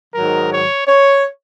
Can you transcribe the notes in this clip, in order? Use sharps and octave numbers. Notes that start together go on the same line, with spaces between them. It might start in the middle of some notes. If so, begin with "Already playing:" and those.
G#2 D#3 F#3 A#4
C#5
C#5